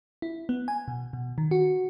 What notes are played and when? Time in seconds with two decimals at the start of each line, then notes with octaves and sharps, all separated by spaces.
0.22 E4
0.49 B3
0.68 G#5
0.88 B2
1.13 B2
1.38 D#3
1.51 F#4